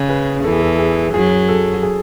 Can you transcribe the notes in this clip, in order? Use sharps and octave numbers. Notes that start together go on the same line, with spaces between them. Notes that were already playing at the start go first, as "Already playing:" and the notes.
Already playing: C#3
G#4 B4
E2 E3 A4
G#4
A4
G#4
F#2 F#3 G#4
A4
G#4